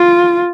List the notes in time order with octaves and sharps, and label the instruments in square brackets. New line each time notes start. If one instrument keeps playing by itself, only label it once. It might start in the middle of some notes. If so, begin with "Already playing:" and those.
Already playing: [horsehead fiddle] F4